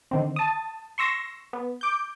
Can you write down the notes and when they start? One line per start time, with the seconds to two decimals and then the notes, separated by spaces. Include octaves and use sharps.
0.11 D3 D#3 C4
0.36 A5 D#6
0.98 C6 C#6 E6 A#6
1.53 B3
1.81 D6 G6